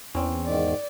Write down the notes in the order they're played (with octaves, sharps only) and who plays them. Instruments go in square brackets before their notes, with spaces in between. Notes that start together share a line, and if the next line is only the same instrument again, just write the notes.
[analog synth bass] E2 [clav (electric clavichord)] C4 C#4
[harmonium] G#2 D#3 [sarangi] D5